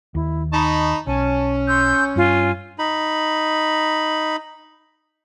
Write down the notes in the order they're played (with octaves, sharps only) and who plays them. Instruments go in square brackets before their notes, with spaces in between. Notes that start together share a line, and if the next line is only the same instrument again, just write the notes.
[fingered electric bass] D#2 [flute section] E4
[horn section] D#4 A5 B5 [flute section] C#6
[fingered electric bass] B1 [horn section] C#4 [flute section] G#5 A5
[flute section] C6 E6 G6
[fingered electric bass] G2 [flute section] F4 G#5
[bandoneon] D#4 B5